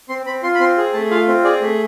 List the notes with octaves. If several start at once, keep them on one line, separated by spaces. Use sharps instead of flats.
C4 C6
C4 B5
F4 C6
B5
C4 C6
G#4
A3 A5
F4 F5
C4
G#4 D5
A3